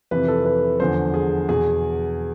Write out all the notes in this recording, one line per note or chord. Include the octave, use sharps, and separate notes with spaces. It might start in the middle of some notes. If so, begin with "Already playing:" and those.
F2 C3 E3 B4
A4
B4
E2 D3 F3 C5
G#4
E2 B2 G#4